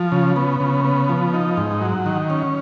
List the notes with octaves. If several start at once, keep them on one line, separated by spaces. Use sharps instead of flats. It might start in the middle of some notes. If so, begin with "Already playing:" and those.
Already playing: F3
C#3
B3
C#3
B3
F3
D#4
G#2
F#3
D#3
C#4